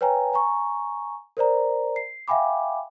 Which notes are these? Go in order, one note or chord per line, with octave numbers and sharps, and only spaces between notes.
B4 C#5 G5 G#5 A#5
G#5 A#5 C#6
A#4 C5 D5 A#5
C7
E5 F5 G5 G#5 B5 D6